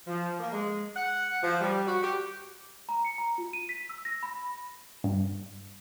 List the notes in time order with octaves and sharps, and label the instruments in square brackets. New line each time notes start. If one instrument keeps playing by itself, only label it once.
[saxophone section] F3
A#3
G#3
F#5
F3
G3
F#4
G4
[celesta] A#5
C#7
A#5
F4
D#7
B6
E6
A#6
B5
[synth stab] G2